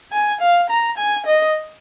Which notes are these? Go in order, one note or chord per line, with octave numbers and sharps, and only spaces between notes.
G#5
F5
A#5
G#5
D#5